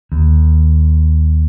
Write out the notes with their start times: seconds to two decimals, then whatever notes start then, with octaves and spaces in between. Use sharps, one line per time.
0.12 D#2